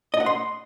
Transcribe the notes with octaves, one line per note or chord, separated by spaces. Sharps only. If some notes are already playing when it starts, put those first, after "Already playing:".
D#5
F#5
C6